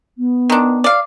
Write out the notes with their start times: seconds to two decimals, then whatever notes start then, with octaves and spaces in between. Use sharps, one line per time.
0.18 B3
0.50 D#3 D4
0.84 D5 F5